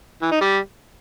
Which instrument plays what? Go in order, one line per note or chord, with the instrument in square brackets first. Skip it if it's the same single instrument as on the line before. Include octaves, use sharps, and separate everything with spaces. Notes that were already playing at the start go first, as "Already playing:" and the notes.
[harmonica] E3
D#4
G3